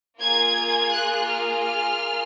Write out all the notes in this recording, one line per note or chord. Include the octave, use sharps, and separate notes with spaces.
A#3 F4 G#4 G#6
F#6
F6
F6